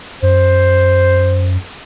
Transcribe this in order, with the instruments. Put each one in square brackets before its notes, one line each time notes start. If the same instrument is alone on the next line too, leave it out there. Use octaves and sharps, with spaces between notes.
[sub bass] F#2 [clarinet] C5